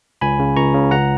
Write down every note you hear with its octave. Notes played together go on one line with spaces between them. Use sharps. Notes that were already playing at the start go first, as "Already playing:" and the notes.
C#2 G#5 B5
C#3
C#2 A#5 C#6
C#3
C#2 F#5 A#5